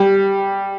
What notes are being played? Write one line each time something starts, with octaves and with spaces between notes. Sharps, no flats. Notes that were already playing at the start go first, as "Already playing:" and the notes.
Already playing: G3